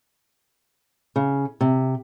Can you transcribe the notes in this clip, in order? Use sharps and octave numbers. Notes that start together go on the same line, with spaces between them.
C#3
C3